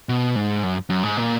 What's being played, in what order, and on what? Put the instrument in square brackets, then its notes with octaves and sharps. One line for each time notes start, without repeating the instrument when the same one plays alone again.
[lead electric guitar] B2
G#2
F#2
F#2
G#2
A#2